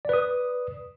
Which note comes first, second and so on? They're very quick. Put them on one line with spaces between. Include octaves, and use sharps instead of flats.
D5 B4 D#6